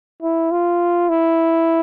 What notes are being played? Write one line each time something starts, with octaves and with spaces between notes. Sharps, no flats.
E4
F4
E4